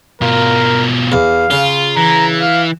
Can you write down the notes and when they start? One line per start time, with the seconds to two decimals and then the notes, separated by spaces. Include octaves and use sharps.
0.22 B2 F4 A#4
1.12 E2 F5
1.51 C#3 F4
1.96 E3 A#5
2.41 F5